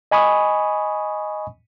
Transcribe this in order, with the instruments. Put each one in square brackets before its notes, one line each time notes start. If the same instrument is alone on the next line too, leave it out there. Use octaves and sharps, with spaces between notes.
[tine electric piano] D#5 G#5 B5 C#6 D#6